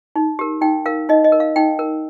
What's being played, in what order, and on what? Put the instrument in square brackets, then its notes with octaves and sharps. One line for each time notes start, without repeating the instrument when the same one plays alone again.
[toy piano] D#4
G4 A#4
D#4 G5
A#4 F5
D#4 D#5
D#5
A#4
F5
D#4 G5
A#4